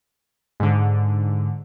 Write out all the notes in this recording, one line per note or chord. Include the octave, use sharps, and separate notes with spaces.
G#2 D3